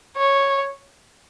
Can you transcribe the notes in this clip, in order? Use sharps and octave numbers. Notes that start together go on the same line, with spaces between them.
C#5